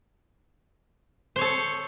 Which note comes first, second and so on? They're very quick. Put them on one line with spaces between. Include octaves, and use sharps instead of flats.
C5 C#5 A4